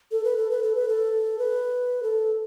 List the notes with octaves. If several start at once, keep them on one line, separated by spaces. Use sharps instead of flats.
A4
B4
A4
B4
A4
B4
A4
B4
A4